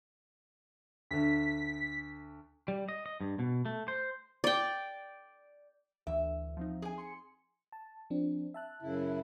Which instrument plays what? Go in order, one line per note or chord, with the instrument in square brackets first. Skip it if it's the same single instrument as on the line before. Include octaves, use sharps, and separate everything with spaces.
[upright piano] D2 D3 [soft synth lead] B6
[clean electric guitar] G3
D#5
D#5
G2
B2
A3
C5
[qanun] D5 G5
[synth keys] D2 E3 [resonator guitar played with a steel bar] E5
[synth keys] F3 C4 D#4
[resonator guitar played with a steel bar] G#4 G#5
[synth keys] C6 C#7
[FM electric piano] A5
F3 C4 D4
E5 A5 F#6
[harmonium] F#2 C#3 E4